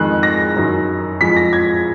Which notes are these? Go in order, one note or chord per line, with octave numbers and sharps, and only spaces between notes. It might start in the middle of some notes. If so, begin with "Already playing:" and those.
Already playing: F2 D#3 G#3 F#6
A#6
F#2 D#3 F#3
F2 F3 G#3 B6
A#6
G#6